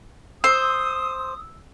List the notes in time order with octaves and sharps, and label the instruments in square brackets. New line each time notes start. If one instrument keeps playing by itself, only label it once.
[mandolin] C5 [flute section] D#6 [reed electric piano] E6